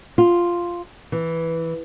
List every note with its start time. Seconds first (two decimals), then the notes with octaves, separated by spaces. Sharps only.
0.18 F4
1.12 E3